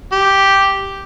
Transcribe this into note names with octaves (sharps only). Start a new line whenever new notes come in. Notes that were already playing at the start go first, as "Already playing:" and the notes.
G4